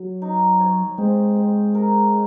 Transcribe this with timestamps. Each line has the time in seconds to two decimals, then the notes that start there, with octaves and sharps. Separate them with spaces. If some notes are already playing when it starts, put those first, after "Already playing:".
Already playing: F#3
0.22 D#4
0.60 C#5
0.98 G#3 C4
1.36 C4
1.75 A#4